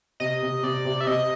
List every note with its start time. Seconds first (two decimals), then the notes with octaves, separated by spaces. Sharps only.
0.20 C3 D#5
0.43 C3
0.63 C3 D5
0.85 C3
1.01 E5
1.07 C3 D#5